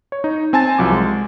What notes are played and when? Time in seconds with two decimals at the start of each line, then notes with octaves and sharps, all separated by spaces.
0.12 C#5
0.24 D#4
0.53 C4 G#5 A5 A6
0.78 C2 F3 F#3 D6
0.92 G#3